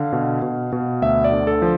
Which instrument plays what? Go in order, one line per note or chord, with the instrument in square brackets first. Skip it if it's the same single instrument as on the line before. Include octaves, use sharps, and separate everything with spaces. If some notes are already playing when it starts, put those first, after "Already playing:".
Already playing: [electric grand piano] D3 F5
B2
B2
B2
D2 E5
D5
D3
A4
F3